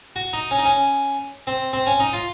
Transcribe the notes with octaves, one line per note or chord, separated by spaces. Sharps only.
F#4
D#4
C#4
D#4
C#4
C4
C4
C#4
D#4
F4